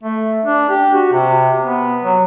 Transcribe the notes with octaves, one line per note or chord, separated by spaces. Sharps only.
A3
D4
G4
F#4
C3
B3
F#3